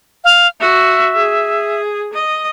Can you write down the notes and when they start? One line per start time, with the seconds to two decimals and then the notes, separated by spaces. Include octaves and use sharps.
0.24 F5
0.60 F#4 E5
1.16 G#4
2.13 D#5